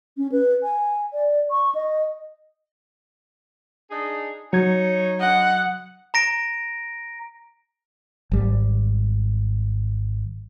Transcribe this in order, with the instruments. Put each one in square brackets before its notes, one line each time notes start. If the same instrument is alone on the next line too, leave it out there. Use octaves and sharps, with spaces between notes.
[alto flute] C#4
B4
G#5
D5
C#6
D#5
[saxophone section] D4 D#4 G#4
[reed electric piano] F#3 G#6 [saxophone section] D#4 C#5
[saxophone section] D3 D#5 [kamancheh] F#5
[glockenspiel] A#5 A#6 D7
[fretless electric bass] G#1 G3